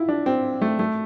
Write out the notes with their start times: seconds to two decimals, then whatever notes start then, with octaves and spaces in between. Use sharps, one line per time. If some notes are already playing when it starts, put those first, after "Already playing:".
Already playing: E4 F4
0.09 D4
0.26 C4
0.62 A3
0.79 A3